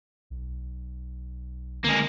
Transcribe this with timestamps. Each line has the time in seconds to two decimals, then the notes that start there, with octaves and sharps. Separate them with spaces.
0.30 B1
1.85 D3 G#3 A#3